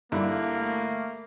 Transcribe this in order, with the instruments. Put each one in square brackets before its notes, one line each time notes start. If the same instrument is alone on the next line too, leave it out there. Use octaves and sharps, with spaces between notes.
[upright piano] G2 D3 E4 [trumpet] A#3
[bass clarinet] A3